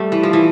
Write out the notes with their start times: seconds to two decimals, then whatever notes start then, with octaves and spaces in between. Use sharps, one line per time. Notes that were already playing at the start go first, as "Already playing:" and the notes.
Already playing: G3 A3
0.12 E3
0.23 F3
0.33 E3